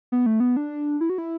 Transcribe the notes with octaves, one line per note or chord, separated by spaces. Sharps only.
B3
A3
B3
D4
E4
F#4
E4